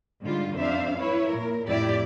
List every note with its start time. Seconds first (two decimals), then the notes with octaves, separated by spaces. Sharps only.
0.23 G#2 D3 G3 F4
0.57 F2 D4 C5 E5 F5
0.99 E4 B4 C#5
1.29 A#2 A#4
1.68 F2 A2 E4 G4 D5